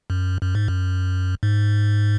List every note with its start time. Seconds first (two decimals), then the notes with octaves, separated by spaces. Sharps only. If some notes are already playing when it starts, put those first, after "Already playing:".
0.10 F#2
0.42 F#2
0.55 G#2
0.68 F#2
1.43 G#2